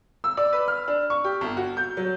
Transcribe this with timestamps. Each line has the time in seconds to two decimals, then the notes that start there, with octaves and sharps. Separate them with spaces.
0.24 E6
0.37 D5
0.53 B4
0.68 F6
0.88 D4
1.10 C#6
1.24 G4
1.41 G1
1.57 F#4
1.77 G6
1.97 F#3